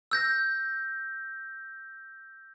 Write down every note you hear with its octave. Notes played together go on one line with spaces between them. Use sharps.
E6 G6 A#6